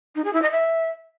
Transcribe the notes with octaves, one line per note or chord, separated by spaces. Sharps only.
D#4
G#4
E4
D#5
E5